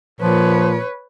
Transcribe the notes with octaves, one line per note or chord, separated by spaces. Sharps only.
A#2 F3 B4 C#5